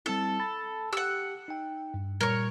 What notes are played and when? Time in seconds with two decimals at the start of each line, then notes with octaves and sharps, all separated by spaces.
0.06 G3 C4 E4 A4
0.40 B5 A6
0.93 G4 F#5 E6
1.48 D#4 G5
1.94 G2
2.21 A#2 G3 A#4 C#5 G#6